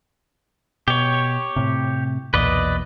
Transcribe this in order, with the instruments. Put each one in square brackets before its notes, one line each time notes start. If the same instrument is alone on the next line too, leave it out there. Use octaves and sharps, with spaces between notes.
[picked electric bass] B2 [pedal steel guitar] G4 C#5
[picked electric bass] A2 C3
[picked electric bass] B1 E2 A#2 [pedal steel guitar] B4 D5 D#5